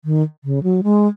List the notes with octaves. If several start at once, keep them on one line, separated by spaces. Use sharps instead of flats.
D#3
C#3
F#3
G#3